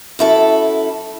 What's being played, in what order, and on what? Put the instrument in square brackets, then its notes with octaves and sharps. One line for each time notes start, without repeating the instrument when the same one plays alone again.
[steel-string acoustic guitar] F#2 E4 A4